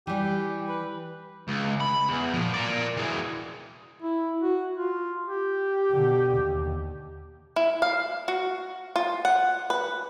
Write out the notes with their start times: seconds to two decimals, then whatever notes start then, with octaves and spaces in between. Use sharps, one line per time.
0.07 E3 G3 G4
0.69 B4
1.48 C#2
1.81 B5
2.09 E2
2.34 A#2 F3
2.54 A#4 D5
2.97 E3 G#3
4.02 E4
4.41 F#4
4.78 F4
5.26 G4
5.91 B2 D3
6.36 D#2
7.56 E4
7.82 F5
8.28 F#4
8.96 F4
9.25 F#5
9.70 B4